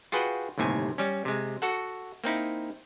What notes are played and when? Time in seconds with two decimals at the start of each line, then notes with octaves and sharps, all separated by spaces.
0.12 F4 F#4 G#4 B4 F#5 G5
0.58 G1 D#2 A2 C3 G#5
0.98 G3 C#4
1.25 C3 G#3
1.62 F#4 A4 F#5
2.24 A#3 C4 D#4 E4